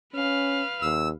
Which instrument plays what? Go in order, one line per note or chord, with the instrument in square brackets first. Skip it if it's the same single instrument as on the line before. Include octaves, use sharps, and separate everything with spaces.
[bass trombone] C#4 [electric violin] B4 F5
[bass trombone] D#2 [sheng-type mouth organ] E6